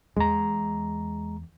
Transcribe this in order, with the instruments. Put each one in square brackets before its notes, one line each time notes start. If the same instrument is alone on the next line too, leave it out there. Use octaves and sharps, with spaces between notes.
[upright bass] E2 [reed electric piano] G#3 A#5